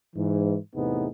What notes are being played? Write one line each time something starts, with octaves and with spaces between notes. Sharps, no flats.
G#2 E3
E2 A2 C3 B3 D#4 G#4